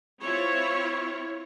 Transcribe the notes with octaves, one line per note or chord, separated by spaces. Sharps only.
C4 E4 F4 C#5